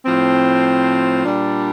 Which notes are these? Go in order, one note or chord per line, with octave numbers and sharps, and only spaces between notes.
A2 F3 C4
A#2 G3 D4